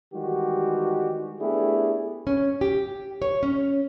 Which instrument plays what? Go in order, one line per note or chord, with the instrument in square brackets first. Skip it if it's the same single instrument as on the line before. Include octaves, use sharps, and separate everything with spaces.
[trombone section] D#3 E3 G3 G#3 F#4 G4
A3 B3 D4 E4 G4 G#4
[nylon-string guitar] C#4
G4
C#5
C#4